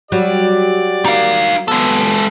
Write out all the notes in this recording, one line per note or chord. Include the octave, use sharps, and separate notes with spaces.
F#3 G3 G4 D5
D#4 F5
G#3 B3 A4